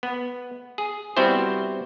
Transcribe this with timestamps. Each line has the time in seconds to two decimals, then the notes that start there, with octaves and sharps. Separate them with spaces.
0.03 B3
0.78 G#4
1.17 G3 B3 C4 E4 F#4 C5